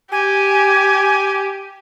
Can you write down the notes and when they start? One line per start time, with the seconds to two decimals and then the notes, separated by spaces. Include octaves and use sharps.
0.12 G4 G#5